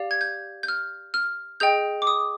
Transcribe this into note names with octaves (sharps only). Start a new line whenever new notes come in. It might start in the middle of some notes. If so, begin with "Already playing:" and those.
Already playing: G4 D5 F5
G#6
G6
G6
F6
F6
G#4 D#5 G5 G6
D6
D#6